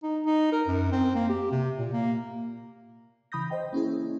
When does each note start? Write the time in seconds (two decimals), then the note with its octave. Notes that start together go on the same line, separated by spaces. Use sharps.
0.03 D#4
0.26 D#4
0.52 A#4
0.67 F#2
0.92 C4
1.15 A#3
1.29 G4
1.51 C3
1.77 A#2
1.93 A#3
3.32 C#3 E3 B5 D#6 G6 A#6
3.50 C5 D#5 G5
3.73 A#3 C#4 E4 G#4